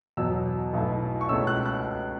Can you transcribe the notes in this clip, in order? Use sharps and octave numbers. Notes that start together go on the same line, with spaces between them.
E2 B2 F#3 E6
B1 B2 A3 E4
C#6
C#2 B2 A3 C#4 E6
F#6
F#6